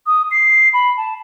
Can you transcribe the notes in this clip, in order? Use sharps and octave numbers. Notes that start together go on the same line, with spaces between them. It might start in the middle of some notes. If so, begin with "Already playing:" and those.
D#6
C7
B5
A5